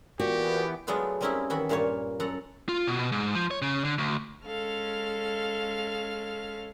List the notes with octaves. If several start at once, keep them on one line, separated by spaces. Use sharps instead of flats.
A#2 E3 B3 F#4 G4
F#3 G#3 A3 B3 D4 F4
G3 A#3 C4 C#4 D#4 E4
D#3 E3 F#4 E5 B5
G2 A#2 A#3 F4 C#5
F#2 A4 F#5 A#5
F4
B2
B2
G#2
F3
C#5
C#3
D3
D2
G#3 C#4 A4 F5 F6